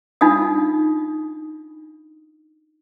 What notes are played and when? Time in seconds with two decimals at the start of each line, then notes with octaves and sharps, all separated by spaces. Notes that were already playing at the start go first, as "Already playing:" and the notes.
0.21 D4 D#4 F4 F5 D#6